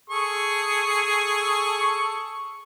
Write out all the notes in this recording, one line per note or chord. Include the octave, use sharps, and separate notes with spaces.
G#4 A4 C#6